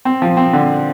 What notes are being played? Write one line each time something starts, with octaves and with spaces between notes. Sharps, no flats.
C4
F3
C4
D3